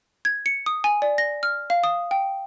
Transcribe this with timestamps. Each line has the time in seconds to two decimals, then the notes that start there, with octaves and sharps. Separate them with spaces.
0.25 G#6
0.46 C#7
0.66 D#6
0.84 G#5
1.02 D5
1.18 A#6
1.43 F6
1.70 F5
1.84 D#6
2.11 G5